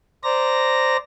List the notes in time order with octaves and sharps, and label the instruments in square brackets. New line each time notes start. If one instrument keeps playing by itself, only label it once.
[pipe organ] C5 D5 A#5 A#6